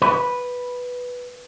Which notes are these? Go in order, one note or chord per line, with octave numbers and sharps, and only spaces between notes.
B4